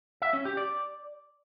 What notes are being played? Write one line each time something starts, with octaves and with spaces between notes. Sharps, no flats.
E5
C#4
G4
D5